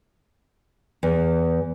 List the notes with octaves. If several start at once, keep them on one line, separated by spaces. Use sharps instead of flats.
E2